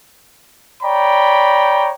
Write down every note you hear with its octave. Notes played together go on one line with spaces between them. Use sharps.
C#5 D5 G5 A#5 B5